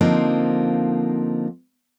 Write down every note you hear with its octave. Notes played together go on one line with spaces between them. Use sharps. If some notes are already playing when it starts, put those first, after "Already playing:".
D3 F3 A#3 C4 D#4